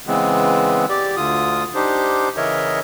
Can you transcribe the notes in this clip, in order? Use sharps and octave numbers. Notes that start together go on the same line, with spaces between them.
C#3 E3 G#3 B3 C4
G4 D5
D2 D3 F4 D#6
D4 D#4 G4 C5
C#3 E3 A#4 C#5 D#5 E5